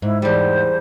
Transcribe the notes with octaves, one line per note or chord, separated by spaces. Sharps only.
G#2 E4
E2 G3 C5